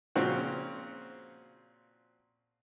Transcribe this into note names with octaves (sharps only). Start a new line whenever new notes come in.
A#2 C#3 F3 C4 F#4